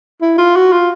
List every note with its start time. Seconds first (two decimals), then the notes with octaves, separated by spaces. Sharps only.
0.21 E4
0.38 F4
0.56 F#4
0.72 F4